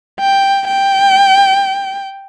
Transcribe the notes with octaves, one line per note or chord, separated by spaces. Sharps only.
G5
G5